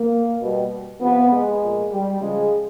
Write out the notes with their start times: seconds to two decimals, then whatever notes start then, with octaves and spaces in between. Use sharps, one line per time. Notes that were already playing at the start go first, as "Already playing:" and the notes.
Already playing: A#3
0.41 B2 G3
1.01 C3 F3 B3
1.31 G#3
1.61 A#2 F3
1.91 G3
2.21 C#3 F3 G#3